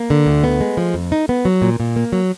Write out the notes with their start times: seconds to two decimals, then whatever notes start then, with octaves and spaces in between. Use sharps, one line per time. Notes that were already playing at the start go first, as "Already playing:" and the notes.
Already playing: A#3
0.10 D3
0.26 D2
0.44 B3
0.61 G#3
0.77 F3
0.94 F2
1.12 D#4
1.29 B3
1.45 F#3
1.62 A#2
1.80 A#2
1.96 A#3
2.12 F#3